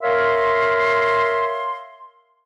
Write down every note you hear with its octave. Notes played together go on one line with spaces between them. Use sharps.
A#4 C#5 E5 F5 C6